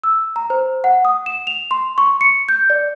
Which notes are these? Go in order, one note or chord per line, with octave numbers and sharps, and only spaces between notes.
E6
A#5
C5
F#5
D#6
E7
F7
C6
C#6
C#7
G6
D5